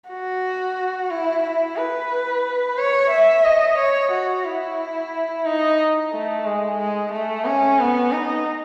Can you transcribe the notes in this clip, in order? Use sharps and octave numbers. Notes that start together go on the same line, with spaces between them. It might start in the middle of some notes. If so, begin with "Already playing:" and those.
F#4
E4
E4
B4
C#5
E5
D#5
C#5
F#4
E4
D#4
A3
G#3
G#3
A3
C#4
B3
D#4